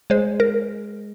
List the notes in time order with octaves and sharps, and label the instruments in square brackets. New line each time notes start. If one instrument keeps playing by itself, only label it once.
[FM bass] G#3 [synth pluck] C5
[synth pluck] A#4